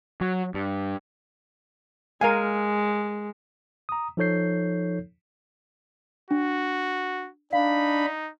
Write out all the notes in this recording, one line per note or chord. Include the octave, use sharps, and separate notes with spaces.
F#3
G2
G#3 A#4 F5 G#5
A#5 D#6
F3 D#4 A4 C#5 G6 C7
D4 F#4
D4 D#4 F5 B5